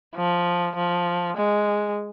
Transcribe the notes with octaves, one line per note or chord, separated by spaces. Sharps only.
F3
F3
G#3